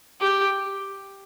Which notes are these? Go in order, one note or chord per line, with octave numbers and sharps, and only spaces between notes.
G4